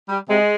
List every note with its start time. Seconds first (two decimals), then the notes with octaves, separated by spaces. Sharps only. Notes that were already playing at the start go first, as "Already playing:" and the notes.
0.09 G3
0.28 C3 G#3